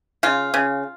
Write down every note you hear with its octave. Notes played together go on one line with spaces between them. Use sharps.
C#3 F4
C#3